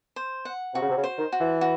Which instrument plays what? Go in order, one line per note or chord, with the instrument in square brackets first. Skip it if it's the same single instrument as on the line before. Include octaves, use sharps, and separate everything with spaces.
[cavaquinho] C5
F#5
[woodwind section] C3 [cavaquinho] F#4
[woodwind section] C#3
C3
C#3
[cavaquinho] C5
[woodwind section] D#3
[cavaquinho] F#4
[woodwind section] E3
[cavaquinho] F#4